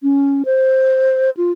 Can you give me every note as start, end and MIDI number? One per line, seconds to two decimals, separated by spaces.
0.03 0.43 61
0.45 1.30 72
1.37 1.52 65